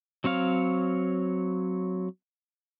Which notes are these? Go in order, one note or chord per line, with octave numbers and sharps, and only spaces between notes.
F#3 C4 C#5 F5